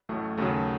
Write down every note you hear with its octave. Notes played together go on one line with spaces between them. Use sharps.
A1 A2 F#3 A3
D#2 C#3 F#3 A3